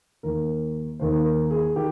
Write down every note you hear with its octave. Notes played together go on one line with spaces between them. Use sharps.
D#2 D#3 A#3 A#4
D#2 D#3 A#3 C5
A#4
G#4
D#3 G4